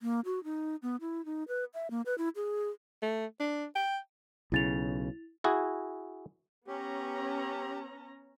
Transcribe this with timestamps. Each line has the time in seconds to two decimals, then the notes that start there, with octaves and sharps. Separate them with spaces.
0.02 A#3
0.25 F#4
0.44 D#4
0.82 B3
1.01 E4
1.25 D#4
1.48 B4
1.74 E5
1.91 A#3
2.06 B4
2.18 E4
2.36 G#4
3.02 A3
3.40 D4
3.75 G5
4.52 B1 C#3 E4 A6 F7
5.44 E4 F#4 G#4
6.67 B3 C#4 G4 A#5